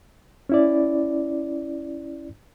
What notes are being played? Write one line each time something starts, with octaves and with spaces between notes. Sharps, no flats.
C#4 E4 D5